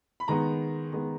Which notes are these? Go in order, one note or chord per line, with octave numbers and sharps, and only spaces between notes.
B5
D#3 G#3 B3 A#5
D#3 G#3 B3